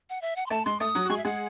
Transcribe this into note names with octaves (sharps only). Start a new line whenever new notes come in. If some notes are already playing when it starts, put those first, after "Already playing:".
F#5
E5
F#5
C6
A3 A5
G#3 C6
A3 D#6
F#3 F#4
F#4
G#3 G#4 C#6
E5
G#3 G#4 F#5